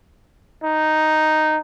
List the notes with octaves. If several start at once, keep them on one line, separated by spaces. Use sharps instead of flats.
D#4